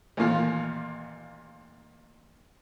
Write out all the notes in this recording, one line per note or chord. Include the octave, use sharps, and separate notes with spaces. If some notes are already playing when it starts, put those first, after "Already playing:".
A1 D#2 A#2 F4